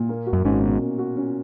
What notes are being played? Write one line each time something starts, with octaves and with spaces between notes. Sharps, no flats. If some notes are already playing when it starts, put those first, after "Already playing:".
Already playing: A#2
A#3
F#4
F#2
G#1 G#2 C#4
B2
A#3
F#4
C#4